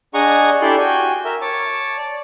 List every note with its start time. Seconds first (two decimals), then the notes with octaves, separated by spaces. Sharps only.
0.14 D4 G#4 D#5 F#5 A#5 C#6
0.62 D4 E4 G4 A4 D5 C6
0.80 F#4 G5 G#5
1.25 A#4 E5
1.41 C#5 A5 D6
1.98 D5